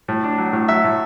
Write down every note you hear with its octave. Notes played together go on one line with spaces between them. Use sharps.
A2
D4
F#3
A2
F#3 E5
A2